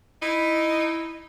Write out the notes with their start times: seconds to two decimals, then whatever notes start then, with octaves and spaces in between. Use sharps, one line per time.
0.22 D#4 E4